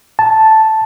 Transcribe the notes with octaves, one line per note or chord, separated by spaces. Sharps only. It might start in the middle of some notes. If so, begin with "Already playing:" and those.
A5